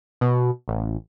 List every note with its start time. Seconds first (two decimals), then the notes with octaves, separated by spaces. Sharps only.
0.21 B2
0.68 A1